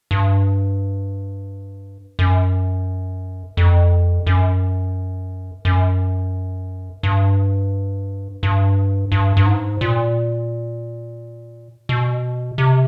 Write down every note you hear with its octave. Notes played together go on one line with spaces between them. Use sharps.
G2
F#2
F2
F#2
F#2
G2
G2
G2
G2
G#2
A#2
B2
C3